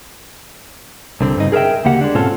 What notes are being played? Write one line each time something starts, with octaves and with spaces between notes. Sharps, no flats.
C2 D3 C4
G2 C#3 D#4
G#4 A#4 B4 E5 G5
D2 C#3 A#3 G4 F#5
G#3 D4
G#2 B2 C4 C#4 F4 A4